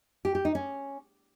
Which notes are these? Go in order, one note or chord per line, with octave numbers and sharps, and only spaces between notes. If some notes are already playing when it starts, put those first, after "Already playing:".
G4
G4
D#4
C#4